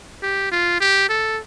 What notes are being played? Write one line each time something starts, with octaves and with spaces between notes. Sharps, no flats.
G4
F4
G4
A4